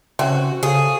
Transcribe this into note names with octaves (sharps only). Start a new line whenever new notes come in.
C#3 E3 C4 C#4 F#4 C5
C#3 G#4 A4 C#5 F5